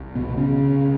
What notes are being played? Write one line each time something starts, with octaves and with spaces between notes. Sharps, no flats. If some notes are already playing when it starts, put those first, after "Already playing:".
Already playing: C2 C3
B2 B3
C#3 C#4